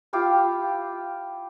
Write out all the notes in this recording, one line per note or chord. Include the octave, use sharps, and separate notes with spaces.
E4 F4 G4 F5